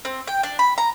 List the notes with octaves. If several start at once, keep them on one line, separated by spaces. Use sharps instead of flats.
C4
G5
D4
B5
A#5